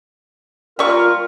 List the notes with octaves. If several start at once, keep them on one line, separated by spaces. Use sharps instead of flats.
G3 F4 A#4 C#6